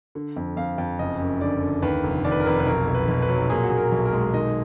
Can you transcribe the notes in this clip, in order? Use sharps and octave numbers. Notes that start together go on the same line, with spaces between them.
D3
F2
F2 F5
F2
F#1 D#5
F#2
D3 D5
D3
D#2 B4
F1
D#2 D5
B4
A#4
F1 B4
B4
B1 A#4
B1
B4
B1
B4
F#3
A#2 G#4
F#4
A#2 G#4
A#4
B1
A#4
G#3
D#3 D#5